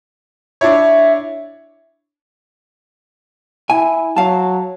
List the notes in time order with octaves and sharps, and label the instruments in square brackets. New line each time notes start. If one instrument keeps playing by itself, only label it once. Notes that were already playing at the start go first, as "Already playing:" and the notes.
[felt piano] D4 E4 C#5 [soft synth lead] E5
[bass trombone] E4 [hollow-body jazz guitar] G#5
[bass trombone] F#3 [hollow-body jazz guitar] F5 A5